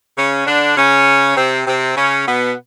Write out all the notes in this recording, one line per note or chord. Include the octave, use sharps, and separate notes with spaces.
C#3 C#4
D3 D4
C#3 C#4
C3 C4
C3 C4
C#3 C#4
B2 B3